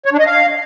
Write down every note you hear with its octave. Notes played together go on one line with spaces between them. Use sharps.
C#5
D4
D#5
F5